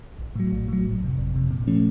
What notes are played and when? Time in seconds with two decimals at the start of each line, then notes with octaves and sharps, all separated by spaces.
0.19 A#1
0.36 A2 F#3
0.52 A#1
0.68 A2 F#3
0.85 G1
1.01 F2 C3
1.18 G1
1.34 F2 C3
1.51 A#2
1.67 F3 A3 C#4